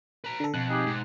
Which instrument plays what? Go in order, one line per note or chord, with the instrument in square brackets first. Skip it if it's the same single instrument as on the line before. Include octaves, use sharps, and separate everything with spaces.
[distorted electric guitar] B4 A#5
[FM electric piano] D3 A4
[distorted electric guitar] F2 [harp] B2 F#5 A5 [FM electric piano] F#6
[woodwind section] D#4 G4 G#4
[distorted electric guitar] G#2